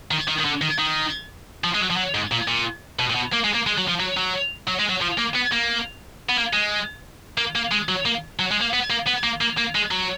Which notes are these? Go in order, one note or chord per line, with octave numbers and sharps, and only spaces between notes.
D#3
D#3
D#3
D3
D#3
D#3
F3
G#3
F#3
F3
F#3
G#2
A#2
A#2
B2
A#2
B2
A#3
G#3
A#3
G#3
F#3
F3
F#3
F#3
F#3
G#3
F#3
F3
A#3
B3
A#3
B3
A#3
G#3
A#3
A#3
G#3
F#3
A#3
F#3
G#3
A#3
B3
A#3
B3
A#3
A#3
A#3
G#3
F#3